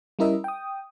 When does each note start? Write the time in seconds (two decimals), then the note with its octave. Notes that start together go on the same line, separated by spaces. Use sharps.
0.19 G3 C#4 E4 A#4 D#5 E5
0.44 G5 D#6